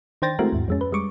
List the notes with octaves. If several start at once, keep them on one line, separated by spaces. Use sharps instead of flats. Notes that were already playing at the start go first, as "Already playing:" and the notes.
D#3 D4 C5 G5 A6 A#6
G#3 A3 C4 E4 F#4 A#4
D#2 G#2
F2 G#3 C#4
B4
G3 G#3 C#6 D6